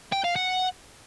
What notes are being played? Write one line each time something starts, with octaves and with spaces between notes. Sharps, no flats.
G5
F5
F#5